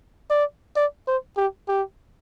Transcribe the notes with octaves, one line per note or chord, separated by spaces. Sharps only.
D5
D5
C5
G4
G4